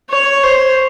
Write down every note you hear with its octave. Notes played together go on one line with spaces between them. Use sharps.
C#5
C5